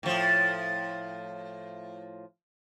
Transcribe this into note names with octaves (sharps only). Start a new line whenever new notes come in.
A2 F3